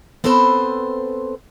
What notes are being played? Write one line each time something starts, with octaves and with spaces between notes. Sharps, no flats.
B3 C4 A4 B4 C5